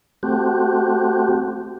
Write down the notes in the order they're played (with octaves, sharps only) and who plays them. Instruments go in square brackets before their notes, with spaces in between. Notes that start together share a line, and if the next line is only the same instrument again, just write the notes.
[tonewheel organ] A3 C4 F#4 G4